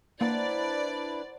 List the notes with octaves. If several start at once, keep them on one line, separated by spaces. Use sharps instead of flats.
A#3 D4 E4 B4 C5 D5 F#5 A#5